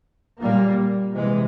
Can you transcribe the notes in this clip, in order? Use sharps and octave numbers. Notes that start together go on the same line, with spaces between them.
A#2 G3 A#3
C3 E3 G#3